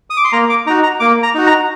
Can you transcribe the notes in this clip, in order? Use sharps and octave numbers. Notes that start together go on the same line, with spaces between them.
D#6
D6
C6
A#3 A#5
D6
D#4 F#4 A#5
A#5
A#3 D6
A#5
D#4 F#4
A#5